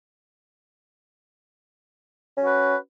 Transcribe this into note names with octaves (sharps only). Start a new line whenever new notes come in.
C#4 F#4 B4